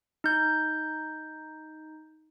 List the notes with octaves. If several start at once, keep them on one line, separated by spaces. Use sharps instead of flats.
D#4 G6